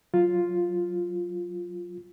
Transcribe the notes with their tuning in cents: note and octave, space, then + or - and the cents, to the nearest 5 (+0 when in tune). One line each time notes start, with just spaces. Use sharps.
F#3 +0 F4 +0